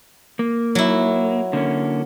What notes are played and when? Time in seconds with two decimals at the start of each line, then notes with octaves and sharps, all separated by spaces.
0.39 A#3
0.75 F#3 E4
1.53 D3 A#3 C#4